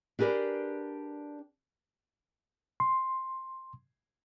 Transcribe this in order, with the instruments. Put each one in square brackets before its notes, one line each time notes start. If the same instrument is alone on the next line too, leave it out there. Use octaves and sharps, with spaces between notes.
[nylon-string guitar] D4 G4 G#4 A#4 B4 D5
[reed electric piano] C6